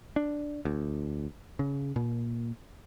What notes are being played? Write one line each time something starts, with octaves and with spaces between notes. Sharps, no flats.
D4
D2
C#3
A#2